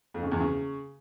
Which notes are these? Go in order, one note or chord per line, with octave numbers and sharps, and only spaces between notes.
F2
C#3
E2
C#3